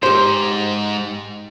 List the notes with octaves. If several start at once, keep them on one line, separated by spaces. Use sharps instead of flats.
G#2 G4 C5